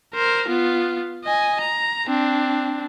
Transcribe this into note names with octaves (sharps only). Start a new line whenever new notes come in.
A#4 C5
B3 F4
D#5 G#5
A#5
C4 D4